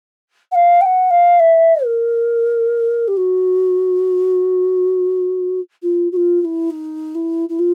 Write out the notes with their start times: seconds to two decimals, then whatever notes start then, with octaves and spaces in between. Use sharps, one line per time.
0.52 F#5
0.55 F5
0.81 G5
0.85 F#5
1.10 F5
1.39 E5
1.84 A#4
3.08 G4
3.17 F#4
5.82 F4
6.12 F#4
6.16 F4
6.41 F4
6.44 E4
6.70 D#4
7.15 E4
7.49 E4
7.59 F4